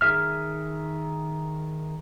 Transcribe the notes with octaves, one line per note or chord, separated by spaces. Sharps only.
D#3 G#4 E5 F6